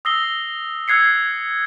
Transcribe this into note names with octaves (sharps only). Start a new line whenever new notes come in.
D#6 E6 A#6 C7 G7
E6 F#6 G#6 C7 C#7